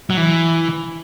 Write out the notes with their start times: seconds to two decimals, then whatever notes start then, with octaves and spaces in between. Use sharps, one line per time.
0.10 F#3
0.17 E3